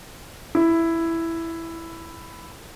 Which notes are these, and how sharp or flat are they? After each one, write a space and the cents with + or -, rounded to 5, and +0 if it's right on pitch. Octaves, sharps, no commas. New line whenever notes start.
E4 +5